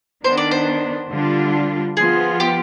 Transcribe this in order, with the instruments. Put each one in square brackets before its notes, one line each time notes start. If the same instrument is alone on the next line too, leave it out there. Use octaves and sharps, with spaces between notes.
[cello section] D#3 B3 D4 [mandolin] C5
[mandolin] D5
C5
[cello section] D3 G3 D4 F4
[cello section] F3 B3 F4 [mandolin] G#4
[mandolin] G4